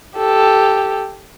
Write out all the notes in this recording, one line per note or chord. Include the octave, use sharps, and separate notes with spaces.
G4 A4